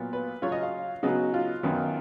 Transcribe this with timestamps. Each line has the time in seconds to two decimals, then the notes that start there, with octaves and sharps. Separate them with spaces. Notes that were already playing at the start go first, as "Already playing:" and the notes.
Already playing: A#2 F#3 B3 F4
0.13 B4
0.42 C#3 F#3 C#4 F4 C#5
0.52 D#5
0.63 F5
1.03 C#3 F#3 B3 D#4 F#4
1.34 F4
1.63 F#2 D#3 F#3 B3